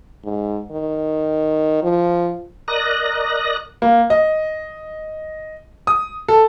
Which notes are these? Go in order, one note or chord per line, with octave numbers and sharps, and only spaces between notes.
G#2
D#3
F3
A#4 D5 D#5 D#6 F#6 A#6
A#3
D#5
D#6
A4